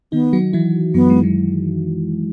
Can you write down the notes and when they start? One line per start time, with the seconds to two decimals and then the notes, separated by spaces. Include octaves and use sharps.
0.12 D#3 B3 D#4
0.33 F#3 F#4
0.53 E3 E4
0.94 F#2 F#3 B3
1.10 G#3
1.23 F#3